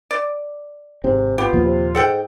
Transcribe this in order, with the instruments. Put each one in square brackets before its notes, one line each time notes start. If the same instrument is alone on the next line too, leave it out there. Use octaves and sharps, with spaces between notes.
[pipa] D5
[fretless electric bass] G#1 C4 [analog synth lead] G#2 [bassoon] C3
[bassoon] B3 [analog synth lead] F4 [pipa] G4
[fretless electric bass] D#2 A#2 F3
[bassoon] C3
[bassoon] G#2 [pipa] A4 F#5 G5